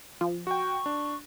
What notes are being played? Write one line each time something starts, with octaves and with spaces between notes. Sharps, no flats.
F3
F#4 G5 C#6
D4